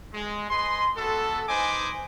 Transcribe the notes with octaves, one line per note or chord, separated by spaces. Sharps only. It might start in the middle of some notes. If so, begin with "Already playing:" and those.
G#3
B4 D#5 G#5 C6
G#3 B3 F#4 A4
D#4 B4 C5 D#5 G#5 D6